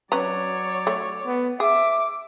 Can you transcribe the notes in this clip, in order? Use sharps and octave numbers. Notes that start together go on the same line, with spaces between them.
F#3 C#4 B4 C#5 D5 A#5
A3
B3
G#4 E5 D6